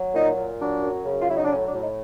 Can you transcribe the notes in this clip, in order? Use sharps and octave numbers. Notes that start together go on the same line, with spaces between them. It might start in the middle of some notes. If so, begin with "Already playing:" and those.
Already playing: F#3
A#2 D#4
A#2
F#3 D4
F#2
C#3
F4
F#3 E4
D#4
D4
A2 C#4
D4
A2
D#4